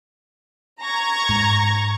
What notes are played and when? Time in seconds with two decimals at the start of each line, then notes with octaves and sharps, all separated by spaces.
0.83 A#5 C#6 G#6
1.29 G#2